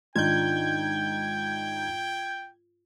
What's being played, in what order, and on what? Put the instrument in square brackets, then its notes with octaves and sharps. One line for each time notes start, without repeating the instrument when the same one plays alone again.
[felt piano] G#2 D#3 D4 [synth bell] F4 [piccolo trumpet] G5 [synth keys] G6 G#6